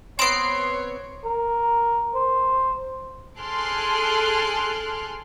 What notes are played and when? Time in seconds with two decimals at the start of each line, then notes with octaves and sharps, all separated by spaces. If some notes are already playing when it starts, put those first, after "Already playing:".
0.19 B3 C4 C#5 C6 C7 D7
1.25 A#4
2.15 C5
3.41 G#4 A4 C6 F6 F#6 D7